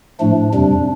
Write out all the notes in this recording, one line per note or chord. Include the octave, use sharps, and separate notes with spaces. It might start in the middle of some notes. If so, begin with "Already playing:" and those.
A2 F3 A3 D4
F2 C3 G3 D4